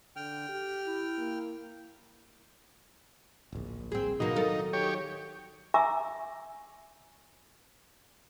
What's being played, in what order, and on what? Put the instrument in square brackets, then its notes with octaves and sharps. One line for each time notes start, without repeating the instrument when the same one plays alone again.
[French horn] D3 [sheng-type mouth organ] G5 F6
[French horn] G4
[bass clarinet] E4
[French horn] A#3
[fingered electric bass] D1 A#1
[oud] C4 G#4
[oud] B2 A#3 [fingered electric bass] D#3 F#3 [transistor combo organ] D#4
[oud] A4 A#4
[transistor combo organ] G4 C#5
[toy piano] E5 G#5 A#5 C#6 D6 E6